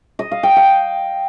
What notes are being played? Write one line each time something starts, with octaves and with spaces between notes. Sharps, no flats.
D#5
F5
G5
F5